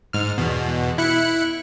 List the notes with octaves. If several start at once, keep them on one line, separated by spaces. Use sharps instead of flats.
G#2 F6
E2 B2
E4 F#6 C#7